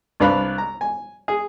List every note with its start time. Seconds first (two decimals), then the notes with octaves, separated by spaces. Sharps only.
0.20 C2 D4 B4 F5 B5 F#6
0.58 A#5
0.81 G#5
1.28 G#4